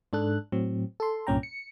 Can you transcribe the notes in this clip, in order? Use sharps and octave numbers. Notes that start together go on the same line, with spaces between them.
G#2 D4 A4 F#6
A2 F#3 C4
A4 C6
C2 G2 A#2 C#4 G5 A#5
C#7